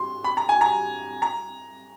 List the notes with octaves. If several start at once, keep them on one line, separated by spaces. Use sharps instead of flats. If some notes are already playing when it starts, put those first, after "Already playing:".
Already playing: C6
B5
A#5
G#5
A#5
A#5